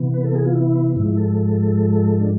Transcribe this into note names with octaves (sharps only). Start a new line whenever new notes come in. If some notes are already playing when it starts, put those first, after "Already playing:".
Already playing: C3 E3 B3
B4
A4
G#4
F4
E4
G#2 F3 G#3 E4
A4
D4